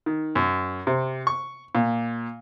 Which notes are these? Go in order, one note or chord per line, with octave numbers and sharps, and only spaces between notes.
D#3
F#2
C3
C#6
A#2